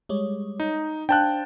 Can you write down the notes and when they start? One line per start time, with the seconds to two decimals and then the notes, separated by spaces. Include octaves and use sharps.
0.09 G3 G#3 C#5
0.60 D#4
1.09 D4 C5 F5 G5 A5 F#6